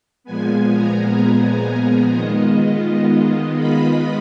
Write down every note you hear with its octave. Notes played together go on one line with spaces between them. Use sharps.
A#2 F3 G#3 B3 G#5
A#5
G#5
D#3 G#3 B3 F4 D#5
B5